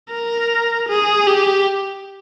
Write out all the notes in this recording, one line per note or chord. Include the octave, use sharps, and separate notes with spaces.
A#4
G#4
G4